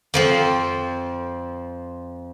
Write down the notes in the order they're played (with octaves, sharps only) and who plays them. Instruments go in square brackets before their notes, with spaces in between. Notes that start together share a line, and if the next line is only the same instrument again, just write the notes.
[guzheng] F2 F3 C4